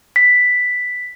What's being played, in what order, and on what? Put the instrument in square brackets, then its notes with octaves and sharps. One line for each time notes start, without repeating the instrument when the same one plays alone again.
[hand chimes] B6